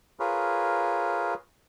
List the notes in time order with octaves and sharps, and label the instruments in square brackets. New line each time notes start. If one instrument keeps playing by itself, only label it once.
[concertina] F4 G#4 A#4 B4 C#5